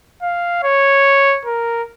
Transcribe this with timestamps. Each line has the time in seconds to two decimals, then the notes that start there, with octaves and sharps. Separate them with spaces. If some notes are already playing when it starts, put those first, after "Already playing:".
0.22 F5
0.63 C#5
1.45 A#4